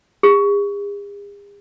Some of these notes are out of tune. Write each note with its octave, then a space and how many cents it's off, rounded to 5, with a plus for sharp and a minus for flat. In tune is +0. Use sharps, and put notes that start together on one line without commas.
G#4 -45